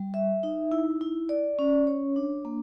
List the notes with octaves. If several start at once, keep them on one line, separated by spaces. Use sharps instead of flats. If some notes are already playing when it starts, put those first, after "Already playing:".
Already playing: G3
E5
D#4
E4
E4
D5
C#4
C#5
D4
A#3